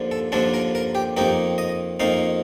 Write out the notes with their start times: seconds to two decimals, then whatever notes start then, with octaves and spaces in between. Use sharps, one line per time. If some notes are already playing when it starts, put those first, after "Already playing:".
Already playing: D#2 D3 F3 A#3 D4
0.11 A4
0.32 D#2 D3 F3 A#3 D4 A4
0.54 A#4
0.75 A#4
0.95 G4
1.17 F2 D#3 A#3 D#4 G4
1.58 D#5
2.00 F2 D#3 A#3 D#4 F5